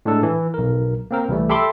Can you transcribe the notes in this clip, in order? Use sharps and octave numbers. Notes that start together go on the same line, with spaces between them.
A2 G#3 D4 A4
E3
B1 A#4
A#3 C4 A#4
C2 E3 G3 A3
G4 A4 E5 B5 C6 D6